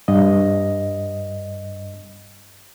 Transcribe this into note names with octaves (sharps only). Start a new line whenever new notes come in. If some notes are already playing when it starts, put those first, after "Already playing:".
G2 D#5